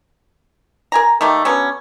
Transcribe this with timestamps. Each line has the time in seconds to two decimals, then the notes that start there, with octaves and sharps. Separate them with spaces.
0.92 A#4 G#5 A#5
1.21 D#3 G3 A3 A#3
1.45 D3 F#3 B3 C#4